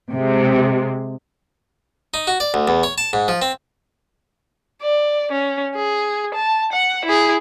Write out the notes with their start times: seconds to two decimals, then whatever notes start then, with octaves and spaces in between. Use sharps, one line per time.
0.13 C3 G#3
2.14 D#4
2.27 F#4
2.40 D5
2.54 D2
2.68 E2
2.83 C#5
2.98 A5
3.13 G#2
3.28 F3
3.42 C4
4.82 D5
5.32 C#4
5.75 G#4
6.35 A5
6.73 F#5
7.05 E4 G#4